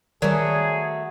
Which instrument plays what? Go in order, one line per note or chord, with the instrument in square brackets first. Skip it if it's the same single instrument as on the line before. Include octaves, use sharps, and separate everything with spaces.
[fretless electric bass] D#3 G3 [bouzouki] F#3 A3 [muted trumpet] G#4 [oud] A#4 D5